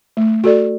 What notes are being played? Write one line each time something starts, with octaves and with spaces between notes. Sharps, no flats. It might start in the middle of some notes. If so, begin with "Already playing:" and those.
A3
F#4 A4 D5